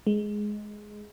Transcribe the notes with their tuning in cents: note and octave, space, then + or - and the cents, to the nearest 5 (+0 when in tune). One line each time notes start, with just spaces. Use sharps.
G#3 +5